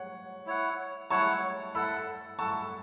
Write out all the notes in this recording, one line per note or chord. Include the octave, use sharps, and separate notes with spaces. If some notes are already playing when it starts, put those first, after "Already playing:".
Already playing: C#5 F#5
E4 C#5 F#5
E4 C#5 F#5 A5 C#6
E4 A4 F#5 B5 E6
E4 A4 F#5 A5 C#6